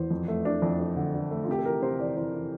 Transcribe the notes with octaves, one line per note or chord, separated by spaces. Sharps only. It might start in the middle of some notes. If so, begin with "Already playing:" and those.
Already playing: E2 C5
F2
A3
D4
F2
D4
D3
D4
A3
F4
C3 G4
A4
E3 A#4
C3 C5
E3 D5
E3 C5
E3